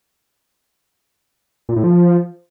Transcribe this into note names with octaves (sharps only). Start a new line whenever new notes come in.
A#2
A2
F3